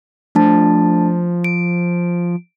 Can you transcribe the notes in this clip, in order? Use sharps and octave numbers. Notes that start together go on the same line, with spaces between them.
F3 A3 D4 A5
D7